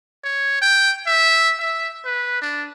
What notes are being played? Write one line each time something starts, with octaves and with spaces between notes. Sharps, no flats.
C#5
G5
E5
E5
B4
D4